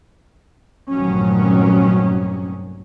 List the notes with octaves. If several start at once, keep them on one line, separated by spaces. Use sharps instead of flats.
F1 A#1 G2 D#3 F#3 C#4